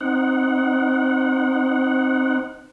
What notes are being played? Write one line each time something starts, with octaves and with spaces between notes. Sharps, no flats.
C4 D#4 F#5